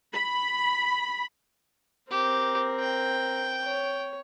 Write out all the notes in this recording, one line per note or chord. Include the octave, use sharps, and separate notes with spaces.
B5
C4 G4 A#4
G5
C#5